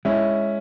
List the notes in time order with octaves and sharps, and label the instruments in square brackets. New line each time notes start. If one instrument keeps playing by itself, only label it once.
[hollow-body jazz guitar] G#3 [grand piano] C#4 E4